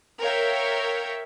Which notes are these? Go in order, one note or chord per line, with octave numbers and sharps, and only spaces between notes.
A#4 C#5 E5 F5 G5